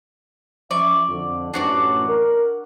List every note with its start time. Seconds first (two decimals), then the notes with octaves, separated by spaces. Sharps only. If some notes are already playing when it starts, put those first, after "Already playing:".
0.71 F3 C#4 D5 E5 C#6
1.08 F2 D3
1.54 A1 F#2 D4 F#4 D5
2.08 A#4